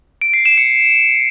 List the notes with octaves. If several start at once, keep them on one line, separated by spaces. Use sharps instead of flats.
D7
C7
E7
C#7